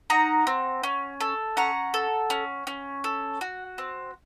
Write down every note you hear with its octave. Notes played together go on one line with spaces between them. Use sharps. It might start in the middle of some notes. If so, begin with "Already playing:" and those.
D#4 F#5 A#5
C4
C#4
A4
C#4 F#5 A#5
A4
C#4
C#4
A4
F#4
C4